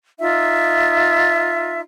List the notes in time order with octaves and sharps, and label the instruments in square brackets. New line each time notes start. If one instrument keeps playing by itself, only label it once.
[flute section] D#4 F4 E5